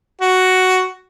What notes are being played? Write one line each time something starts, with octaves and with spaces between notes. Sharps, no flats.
F#4